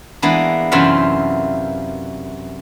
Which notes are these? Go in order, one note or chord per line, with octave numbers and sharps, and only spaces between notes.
E3 G#3 A#3 B3 D4
F#2 C3 E3 F4 E5 F#5